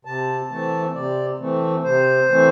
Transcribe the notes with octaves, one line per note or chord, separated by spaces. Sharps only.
C3 A5
E3 A3 C4 A5
C3 D5
E3 A3 C4
C3 C5
E3 A3 C4